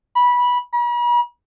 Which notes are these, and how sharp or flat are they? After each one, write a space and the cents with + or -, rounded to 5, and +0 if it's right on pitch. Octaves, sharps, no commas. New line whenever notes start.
B5 -15
B5 -45